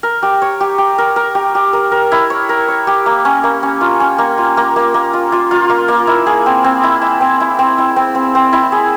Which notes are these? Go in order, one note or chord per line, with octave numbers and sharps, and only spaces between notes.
A#4
G4
C#5
G4
G4
A#4
A#4
G4
G4
A#4
A#4
E4
C#5
A#4
C#5
G4
A#3
C#4
A#3
C#4
F4
C#4
A#3
F4
A#3
A#3
A#3
F4
F4
F4
A#3
A#3
E4
G#4
C4
C4
E4
E4
C4
E4
C4
E4
C4
C4
C4
E4
G#4